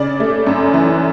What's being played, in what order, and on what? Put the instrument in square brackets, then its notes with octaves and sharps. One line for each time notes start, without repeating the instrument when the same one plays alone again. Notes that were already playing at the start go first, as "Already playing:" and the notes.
Already playing: [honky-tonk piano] C#3 D5
A3
F#2
E3